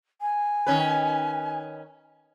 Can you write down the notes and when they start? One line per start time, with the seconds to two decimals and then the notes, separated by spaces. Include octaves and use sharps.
0.21 G#5
0.67 D#3 C#4 B4